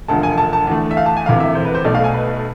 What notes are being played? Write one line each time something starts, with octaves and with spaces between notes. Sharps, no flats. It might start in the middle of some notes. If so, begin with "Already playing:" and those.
E1 D2 D3 F3 A5
G#5
A5
A5
E2 D3 A3
E5
F5
A5
G#5
E1 D2 C3 E3 F5
E5
C5
B4
C5
B1 B2 A3 D5
F5
G#5
B4